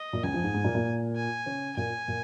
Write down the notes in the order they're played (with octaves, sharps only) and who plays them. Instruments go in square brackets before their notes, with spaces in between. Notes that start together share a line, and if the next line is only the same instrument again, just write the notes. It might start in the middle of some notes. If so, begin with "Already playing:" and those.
Already playing: [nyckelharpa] D#5
[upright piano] A#2
[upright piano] C#2 C#3 [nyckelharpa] G#5
[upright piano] F2 F3
G#2 G#3
G#2 G#3
A#2 A#3
A#2 A#3
[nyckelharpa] G#5
[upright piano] C#3 C#4
[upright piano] A#2 A#3 [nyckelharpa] G#5
[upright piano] A#2 A#3